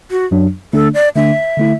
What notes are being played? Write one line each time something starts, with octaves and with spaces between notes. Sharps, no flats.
F#4
F#2 F#3 D4
D3 A3 D4 A4
D5
D3 A3 D4 E5
D3 A3 E4